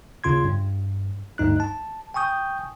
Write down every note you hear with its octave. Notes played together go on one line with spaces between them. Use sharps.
D#2 C#3 F4 C6 G#6
G2
D2 G2 D#4 F#6
A5
G5 G#5 C#6 D#6 G6